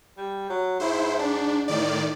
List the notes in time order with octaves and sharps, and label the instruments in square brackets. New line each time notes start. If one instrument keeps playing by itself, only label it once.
[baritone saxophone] G3
F#3
[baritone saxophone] G#2 [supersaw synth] E4 C5
[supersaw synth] D4
A2 D#3 D5